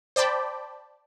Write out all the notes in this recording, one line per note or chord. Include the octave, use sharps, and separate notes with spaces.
C5 D5 G5 A5 B5